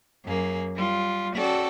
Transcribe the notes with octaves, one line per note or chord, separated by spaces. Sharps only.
F#2 A#3 G#4
G3 F4
C#4 F#4 A4 D5 G5